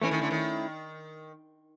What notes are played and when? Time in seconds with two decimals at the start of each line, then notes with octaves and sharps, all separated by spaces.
0.02 E3 A3 C#4 E4
0.11 D#3
0.21 D3
0.31 D#3